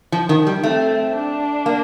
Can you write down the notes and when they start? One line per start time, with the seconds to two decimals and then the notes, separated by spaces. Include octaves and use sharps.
0.12 F3
0.29 D#3
0.47 G3
0.63 A3 C4
1.15 D4
1.66 A#3